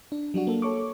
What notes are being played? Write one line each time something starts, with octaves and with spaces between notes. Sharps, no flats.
D4
F#3 G3 D4 F#4
A#3 A4
A4 C#5 C#6 D6